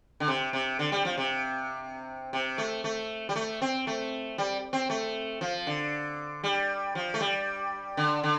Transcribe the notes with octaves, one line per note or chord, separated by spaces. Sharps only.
D3
C3
C3
D3
G3
F3
C3
C3
A3
A3
G3
A3
C4
A3
G3
C4
A3
F3
D3
G3
F3
A3
G3
D3
D3